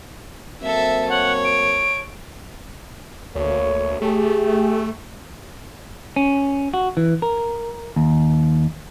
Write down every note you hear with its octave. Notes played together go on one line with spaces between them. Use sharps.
F#3 A#3 C4 A4 E5
C#5 F#5
D7
D2 A3 A#3 C#5
A3 G4 G#4
C#4
F#4
E3
A#4
D#2